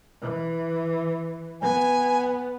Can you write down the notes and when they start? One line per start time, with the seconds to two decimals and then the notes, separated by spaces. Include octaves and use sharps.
0.21 E3
1.62 B3 G#5